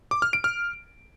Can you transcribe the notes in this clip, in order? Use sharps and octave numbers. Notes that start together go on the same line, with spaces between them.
D6
F6
D7
F6